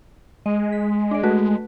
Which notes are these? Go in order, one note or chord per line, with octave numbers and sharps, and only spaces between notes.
G#3 D#5
B6
D4 D5
A3 F#4 B4